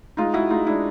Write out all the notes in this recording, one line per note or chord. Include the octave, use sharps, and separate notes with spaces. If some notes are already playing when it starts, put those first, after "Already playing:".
G#3 D#4 F4
G#3 E4 F#4
G#3 D#4 F4
G#3 D4 E4